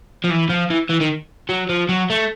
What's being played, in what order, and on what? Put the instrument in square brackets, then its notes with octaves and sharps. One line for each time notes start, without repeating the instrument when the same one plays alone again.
[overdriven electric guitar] F3
E3
F3
E3
E3
D#3
F#3
F3
F#3
A3